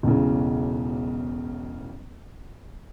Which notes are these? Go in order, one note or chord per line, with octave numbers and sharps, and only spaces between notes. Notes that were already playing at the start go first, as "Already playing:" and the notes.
E1 B1 A2 C#3